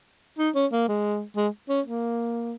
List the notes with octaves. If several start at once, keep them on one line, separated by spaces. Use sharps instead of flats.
D#4
C#4
A#3
G#3
G#3
C#4
A#3